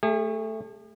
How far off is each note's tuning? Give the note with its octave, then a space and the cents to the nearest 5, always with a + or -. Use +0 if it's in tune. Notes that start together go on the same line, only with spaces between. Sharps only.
A3 +0 G#4 -45